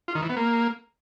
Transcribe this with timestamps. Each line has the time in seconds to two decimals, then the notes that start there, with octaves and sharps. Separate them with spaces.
0.08 F4
0.15 D#3
0.22 E3
0.29 B3
0.37 A#3